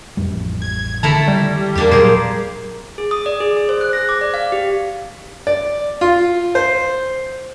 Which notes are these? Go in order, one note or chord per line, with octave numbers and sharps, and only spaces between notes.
A1 F2 G3
G#6
D3 D#3 A3 E4 A5 A#5
G3
E2 A#3 D4 G4
A#2 F#3 G#4 A#4 C5
G#4
D#6
D5
G#4
G#4
C5
F#6
A#6
D6
D5
F5
G4
D5
F4
C5